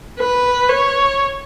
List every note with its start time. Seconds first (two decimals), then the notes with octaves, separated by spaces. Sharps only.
0.20 B4
0.69 C#5